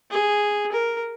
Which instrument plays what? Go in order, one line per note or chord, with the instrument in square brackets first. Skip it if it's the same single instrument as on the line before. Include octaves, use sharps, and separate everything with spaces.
[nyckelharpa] G#4
A#4